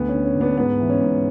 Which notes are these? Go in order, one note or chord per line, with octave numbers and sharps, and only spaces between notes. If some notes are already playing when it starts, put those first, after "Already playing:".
Already playing: D2 B3
C#4
D3
C#4
D2
B3 D4
G#2 B3
E3
C#4
G#2